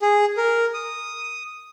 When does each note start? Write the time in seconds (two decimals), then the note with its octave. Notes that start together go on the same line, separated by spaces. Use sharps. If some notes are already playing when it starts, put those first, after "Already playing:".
0.02 G#4
0.37 A#4
0.74 D#6